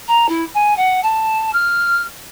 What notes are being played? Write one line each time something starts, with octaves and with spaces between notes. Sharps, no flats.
A#5
E4
G#5
F#5
A5
F6